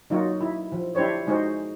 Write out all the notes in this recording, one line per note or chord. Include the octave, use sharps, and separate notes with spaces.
F#3 A#3 D#4 F4 F#4
E4
F3
D4 E4 G4 C5 C#5
G#3 D#4 F#4 G#4 C5